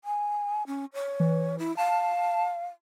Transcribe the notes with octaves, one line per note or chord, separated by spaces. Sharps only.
G#5
C#4
C#5
E3
E4
F5 A5